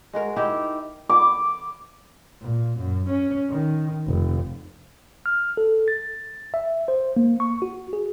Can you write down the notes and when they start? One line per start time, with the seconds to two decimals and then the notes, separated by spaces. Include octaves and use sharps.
0.13 G#3 F#4 A#4
0.36 D#4 E4 G4
1.09 D6
2.41 A#2
2.79 F#2
3.10 C#4
3.50 D#3
4.07 F1
5.26 F6
5.57 A4
5.88 A6
6.54 E5
6.88 C5
7.17 A#3
7.40 C#6
7.62 F#4
7.93 G#4